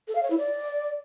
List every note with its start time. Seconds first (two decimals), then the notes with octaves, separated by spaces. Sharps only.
0.08 A4
0.15 F5
0.23 C#5
0.30 E4
0.38 D5